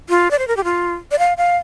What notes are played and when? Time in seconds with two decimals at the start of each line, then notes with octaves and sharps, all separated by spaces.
0.09 F4
0.31 D5
0.39 C5
0.48 A#4
0.57 G4
0.64 F4
1.11 D5
1.19 F5
1.38 F5